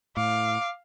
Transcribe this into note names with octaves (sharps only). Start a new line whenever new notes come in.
A2 F5 D6